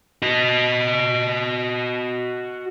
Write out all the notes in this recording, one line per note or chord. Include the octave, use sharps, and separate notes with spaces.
F#4 D#5